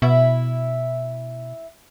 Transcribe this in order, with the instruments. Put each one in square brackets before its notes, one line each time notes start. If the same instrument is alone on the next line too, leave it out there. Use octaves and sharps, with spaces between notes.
[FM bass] B2 [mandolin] E4 E5